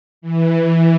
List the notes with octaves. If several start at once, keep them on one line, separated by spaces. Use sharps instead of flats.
E3
E3